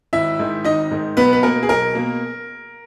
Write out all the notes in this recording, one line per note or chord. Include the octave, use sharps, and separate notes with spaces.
G#1 E4 E5
G#2 D#3
G#1 D#4 D#5
G#2 D#3
B1 B3 B4
B4
B2 A#3 A#4
G#4
B1 A#4
B2 A#3